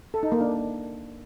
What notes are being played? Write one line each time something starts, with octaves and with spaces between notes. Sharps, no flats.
A4
D#4
A#3
D4